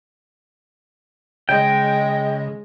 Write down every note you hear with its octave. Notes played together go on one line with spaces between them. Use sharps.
C#3 G#3 D#5 G5